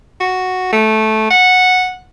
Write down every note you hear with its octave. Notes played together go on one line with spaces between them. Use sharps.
F#4
A3
F#5